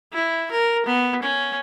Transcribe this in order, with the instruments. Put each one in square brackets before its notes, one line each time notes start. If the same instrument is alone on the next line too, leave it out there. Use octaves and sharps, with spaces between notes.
[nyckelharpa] E4
A#4
B3
C#4